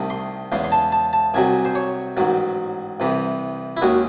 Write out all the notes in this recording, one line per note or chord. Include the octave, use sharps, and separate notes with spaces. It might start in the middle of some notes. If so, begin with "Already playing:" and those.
Already playing: C2 C3 D#3 A3
C6
E2 C#3 G#3 C6
C6
A5
A5
A5
C2 C3 F#3 G#5
C5
C#5
A1 G#2 D#3 F#3
C2 C3 E3
E4
D#2 D#3 G#3 C#4 F#4